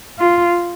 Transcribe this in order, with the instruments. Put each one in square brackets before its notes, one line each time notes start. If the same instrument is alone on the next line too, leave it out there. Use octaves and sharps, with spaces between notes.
[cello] F4